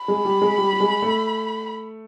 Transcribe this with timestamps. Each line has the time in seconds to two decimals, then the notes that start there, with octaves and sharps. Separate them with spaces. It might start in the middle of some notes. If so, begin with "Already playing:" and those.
Already playing: B5
0.08 G#3
0.25 G3
0.42 G#3
0.58 G3
0.73 G3
0.80 G#3
1.02 A3